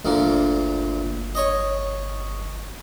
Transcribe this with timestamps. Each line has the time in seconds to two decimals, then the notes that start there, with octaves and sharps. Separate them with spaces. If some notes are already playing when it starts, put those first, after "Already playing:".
0.05 G1 D2 A#2 D3
1.35 C#5 D#5